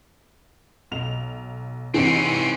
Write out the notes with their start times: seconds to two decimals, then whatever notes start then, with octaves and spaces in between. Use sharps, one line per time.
0.91 B1 F7
1.94 G#2 C3 E3 C4 C#4